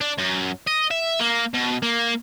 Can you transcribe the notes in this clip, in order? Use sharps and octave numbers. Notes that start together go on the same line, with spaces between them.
D4
F#2
D#5
E5
A#3
B2
A#3